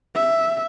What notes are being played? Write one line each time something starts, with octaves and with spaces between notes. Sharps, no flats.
E5